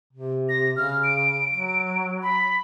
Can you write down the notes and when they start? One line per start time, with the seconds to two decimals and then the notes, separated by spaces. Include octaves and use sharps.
0.13 C3
0.49 A#6
0.76 C#3 F6
1.04 D7
1.52 F#3
2.22 B5